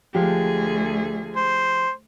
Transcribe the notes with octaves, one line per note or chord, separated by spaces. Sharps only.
D2 F3 G#3 G4 G#4
C5